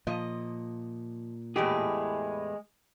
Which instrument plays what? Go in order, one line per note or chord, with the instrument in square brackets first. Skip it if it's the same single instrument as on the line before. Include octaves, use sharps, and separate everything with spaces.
[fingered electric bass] A#2 [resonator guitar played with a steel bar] F3 D#5
[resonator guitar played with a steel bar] E2 A2 G4 [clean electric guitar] G#3 G#4